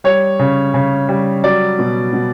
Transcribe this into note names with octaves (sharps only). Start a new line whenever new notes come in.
G3 C#5
C#3
C#3
G3
F#3 D5
B2
B2